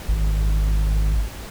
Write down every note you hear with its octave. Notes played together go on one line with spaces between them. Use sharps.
G#1